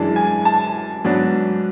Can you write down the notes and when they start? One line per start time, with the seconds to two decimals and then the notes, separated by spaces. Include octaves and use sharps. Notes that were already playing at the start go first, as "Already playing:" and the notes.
Already playing: F#2 E3 G#3 D4 A5
0.16 G#5
0.45 A5
1.04 G#2 F#3 B3 D4